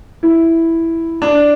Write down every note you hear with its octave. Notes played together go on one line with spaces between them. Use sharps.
E4
D4